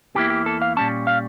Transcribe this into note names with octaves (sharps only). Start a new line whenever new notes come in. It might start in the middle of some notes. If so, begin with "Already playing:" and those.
E2 E3 A#3 E4 G4
G4
A4
F5
A#2 G3 C#4 A5
F5